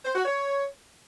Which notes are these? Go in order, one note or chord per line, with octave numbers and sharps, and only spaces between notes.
C5
F#4
C#5